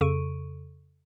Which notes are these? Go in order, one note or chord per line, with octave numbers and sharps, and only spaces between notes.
F2 C#3 A4 C#6 D7 D#7